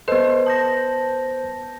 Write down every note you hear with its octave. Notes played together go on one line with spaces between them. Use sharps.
B3 A4 B4 C5 D#5
A5 G6 A#6